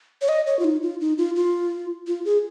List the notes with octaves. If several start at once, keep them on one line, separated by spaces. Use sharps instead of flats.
C#5
D#5
C#5
F4
D#4
F4
D#4
F4
F4
F4
G#4